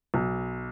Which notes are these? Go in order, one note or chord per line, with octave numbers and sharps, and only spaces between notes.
B1